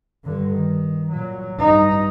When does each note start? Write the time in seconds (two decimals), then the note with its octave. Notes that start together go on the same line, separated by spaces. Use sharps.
0.25 G2 D3
0.54 D#3
1.11 A#2 F#3
1.56 G2 D#4